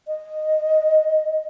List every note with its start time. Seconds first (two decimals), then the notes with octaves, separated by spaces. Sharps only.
0.07 D#5